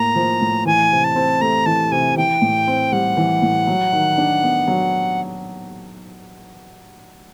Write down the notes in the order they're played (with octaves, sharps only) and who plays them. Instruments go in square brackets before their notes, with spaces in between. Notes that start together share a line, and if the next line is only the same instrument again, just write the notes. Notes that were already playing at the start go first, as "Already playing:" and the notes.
Already playing: [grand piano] A2 A#3 [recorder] A#5
[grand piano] F3
A2
[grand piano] E3 [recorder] G#5
[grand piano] C3
[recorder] A5
[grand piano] C4
[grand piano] A3 [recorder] A#5
[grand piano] E3 [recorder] A5
[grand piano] C3 [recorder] G#5
[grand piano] E3 [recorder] G5
[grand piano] A2
C4
[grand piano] G3 [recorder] F#5
[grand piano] E3
A2
F#3
D#3
D4
B3
F#3